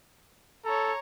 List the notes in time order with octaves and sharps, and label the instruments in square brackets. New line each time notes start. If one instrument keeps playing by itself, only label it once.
[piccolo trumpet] A4 [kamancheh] C#5 A#5